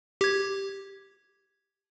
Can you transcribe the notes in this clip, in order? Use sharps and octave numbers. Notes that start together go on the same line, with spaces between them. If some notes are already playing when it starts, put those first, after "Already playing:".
G4 G#6